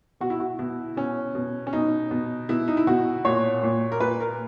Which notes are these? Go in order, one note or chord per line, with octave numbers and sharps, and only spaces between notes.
B2 F#4
E4
F#4
B2 E4
B2 C#4
B2
C#4
B2 D#4
B2
B2 E4
D#4
E4
B2 F#4
A#2 C#5
A#2
A#4
A#2 B4
A#4